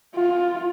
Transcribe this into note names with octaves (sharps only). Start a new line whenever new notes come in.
F4